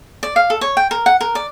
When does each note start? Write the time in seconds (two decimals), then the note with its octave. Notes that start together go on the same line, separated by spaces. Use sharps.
0.23 D5
0.36 F5
0.50 A4
0.61 C#5
0.77 G5
0.91 A#4
1.06 F#5
1.21 A#4
1.35 D5